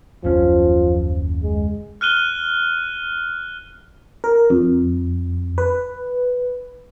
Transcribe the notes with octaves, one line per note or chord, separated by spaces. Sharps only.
F#1 D#2 F3 C#4
G#3
F6 F#6 D#7 G7
A#4
F2
B4